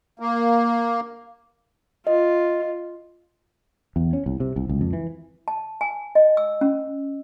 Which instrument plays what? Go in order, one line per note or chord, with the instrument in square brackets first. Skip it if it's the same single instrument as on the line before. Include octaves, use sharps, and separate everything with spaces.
[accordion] A#3
[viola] F4 [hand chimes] D#5
[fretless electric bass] E2
C#4
C2
C3
C2
C#2
F2
E3
[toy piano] A5
G#5
D#5
E6
C#4